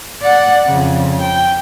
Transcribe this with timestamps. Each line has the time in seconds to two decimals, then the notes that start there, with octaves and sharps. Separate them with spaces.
0.22 D5 F#5
0.67 F2 C#3
1.21 G5